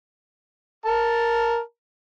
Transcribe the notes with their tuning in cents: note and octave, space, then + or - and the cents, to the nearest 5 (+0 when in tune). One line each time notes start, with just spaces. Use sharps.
A#4 +5 A5 +0